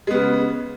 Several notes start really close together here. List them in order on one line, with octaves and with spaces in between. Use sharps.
G#3 B3 C#3